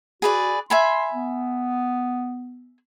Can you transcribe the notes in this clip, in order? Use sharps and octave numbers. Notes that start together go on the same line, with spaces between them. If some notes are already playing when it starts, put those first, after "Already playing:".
F#4 G#4 B4 D5
E5 G#5 B5 C6
B3